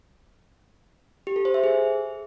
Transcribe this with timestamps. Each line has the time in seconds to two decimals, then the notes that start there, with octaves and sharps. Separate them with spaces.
1.27 G4
1.36 A4
1.45 C5
1.54 E5
1.64 G#4